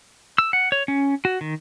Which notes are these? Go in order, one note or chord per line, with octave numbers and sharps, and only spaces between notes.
E6
F#5
C#5
C#4
F#4
D#3